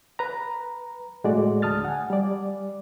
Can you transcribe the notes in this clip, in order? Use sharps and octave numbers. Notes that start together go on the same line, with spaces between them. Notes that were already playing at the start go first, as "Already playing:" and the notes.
B4 A#5
A2 G#3 A3 F#4 D5
D2 A5 D#6 F6 A6
F#5 G#5
G3 D5